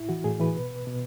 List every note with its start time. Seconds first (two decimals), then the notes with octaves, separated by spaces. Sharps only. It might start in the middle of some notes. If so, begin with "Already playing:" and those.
Already playing: A2 E4
0.09 E3 F#4
0.24 A2 G#4
0.40 E3 B4
0.55 B2
0.87 B2